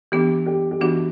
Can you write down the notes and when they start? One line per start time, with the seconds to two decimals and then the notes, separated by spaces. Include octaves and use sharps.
0.12 E3 B3 D4 G4
0.46 G4
0.71 G4
0.81 E3 B3 D4 F#4